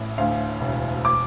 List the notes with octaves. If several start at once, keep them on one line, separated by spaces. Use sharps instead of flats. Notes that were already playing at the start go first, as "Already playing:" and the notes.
Already playing: A1 A2
D2 F5
E1
D6